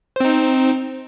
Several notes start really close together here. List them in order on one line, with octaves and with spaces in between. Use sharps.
C5 C4 D#4